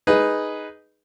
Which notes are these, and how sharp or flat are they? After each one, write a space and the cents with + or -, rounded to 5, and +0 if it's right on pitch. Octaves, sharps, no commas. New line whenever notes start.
D#4 +0 G#4 +0 B4 +0